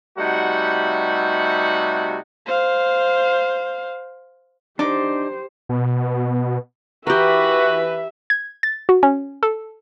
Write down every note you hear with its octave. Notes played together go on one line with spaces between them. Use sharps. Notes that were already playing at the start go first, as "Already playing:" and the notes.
C3 G3 A3 D#4 F#4 F#5
C5 F5
D4 D#4 G4 C5 D6
B2
E3 F#4 G4 A#4 B4 E5
G#6
A6
F#4
C#4
A4